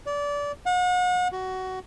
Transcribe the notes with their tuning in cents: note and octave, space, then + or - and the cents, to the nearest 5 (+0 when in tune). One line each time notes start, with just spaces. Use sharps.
D5 -25
F#5 -40
F#4 +15